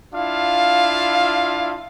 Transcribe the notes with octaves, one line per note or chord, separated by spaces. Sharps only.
D4 E4 F4 F5